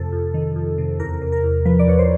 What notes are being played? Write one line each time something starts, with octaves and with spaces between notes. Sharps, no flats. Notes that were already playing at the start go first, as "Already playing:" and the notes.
Already playing: F2 C3 A4
F2
D#3
F2
C3
E2 A#4
C3
A#4
E2
F3 B4
D5
E2 C#5
C5